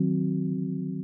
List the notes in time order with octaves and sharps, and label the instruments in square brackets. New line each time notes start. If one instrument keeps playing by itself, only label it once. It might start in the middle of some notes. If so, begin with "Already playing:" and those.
Already playing: [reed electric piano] D#3 F#3 C4 F#4